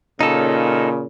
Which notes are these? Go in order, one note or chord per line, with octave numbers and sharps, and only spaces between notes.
A#2 C#3 D#4 A4